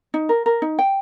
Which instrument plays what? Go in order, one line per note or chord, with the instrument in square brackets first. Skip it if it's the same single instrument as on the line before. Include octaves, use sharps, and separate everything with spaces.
[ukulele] D#4
A#4
A#4
D#4
G5